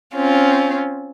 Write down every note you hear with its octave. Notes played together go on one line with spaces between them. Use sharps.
C4 C#4 F4